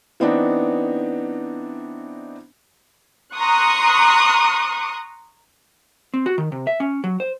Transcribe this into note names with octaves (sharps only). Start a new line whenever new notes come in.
E3 B3 C4 D4 D#4
A#5 C6 C#6 D#6 F#6
C4
F#4
D#3
C3
E5
C#4
F#3
C5